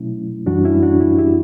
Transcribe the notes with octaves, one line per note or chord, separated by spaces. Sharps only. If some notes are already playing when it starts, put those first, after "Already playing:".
Already playing: B2 F#3 A3 C#4 E4
F#2 E3 G3 D4 F#4
C#4 E4
D4 F#4
C#4 E4
E4 G4